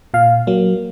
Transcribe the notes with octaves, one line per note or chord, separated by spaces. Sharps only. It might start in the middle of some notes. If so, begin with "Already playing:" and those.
A#2 F5
F#3 A#3